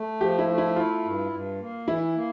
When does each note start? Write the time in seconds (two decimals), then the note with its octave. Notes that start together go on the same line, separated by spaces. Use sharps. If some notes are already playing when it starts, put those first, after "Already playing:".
Already playing: A3
0.20 F3 G4
0.39 E4
0.48 A3
0.58 E4
0.76 E4 F4
1.04 G2
1.32 G2
1.60 A#3
1.87 E3 E4
2.15 A#3